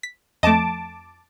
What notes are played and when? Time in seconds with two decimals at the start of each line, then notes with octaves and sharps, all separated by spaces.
0.03 B6
0.43 F2 A3 D#5 A5 D6